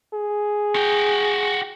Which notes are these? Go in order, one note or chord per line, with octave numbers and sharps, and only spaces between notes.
G#4
F#4 G5